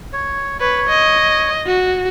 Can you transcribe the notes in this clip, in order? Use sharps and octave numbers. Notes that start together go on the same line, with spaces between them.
C#5
B4 C#5
D#5
F#4